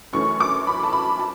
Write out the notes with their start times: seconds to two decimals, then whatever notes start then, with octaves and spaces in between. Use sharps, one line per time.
0.13 F#2 E3 A3 C#4 C#6
0.40 D6
0.67 B5
0.83 A5
0.93 B5
1.19 A5